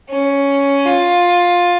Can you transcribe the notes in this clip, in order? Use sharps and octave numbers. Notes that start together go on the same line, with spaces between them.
C#4
F4